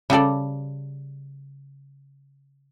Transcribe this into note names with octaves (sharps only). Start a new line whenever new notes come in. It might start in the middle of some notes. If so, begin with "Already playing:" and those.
C#3 G3 A4 D5